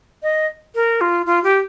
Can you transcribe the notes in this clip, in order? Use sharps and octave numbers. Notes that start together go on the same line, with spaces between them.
D#5
A#4
F4
F4
G4